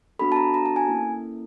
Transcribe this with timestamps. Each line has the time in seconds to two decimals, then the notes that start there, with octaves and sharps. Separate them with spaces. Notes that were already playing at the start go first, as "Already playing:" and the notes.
0.19 B3 D4 F#4 A4 B5
0.32 A5
0.36 A#5
0.54 A#5
0.66 A5
0.76 G#5
0.88 A#3 C#4 E4 A4